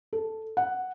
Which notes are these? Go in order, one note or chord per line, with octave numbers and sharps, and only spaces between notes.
A4
F#5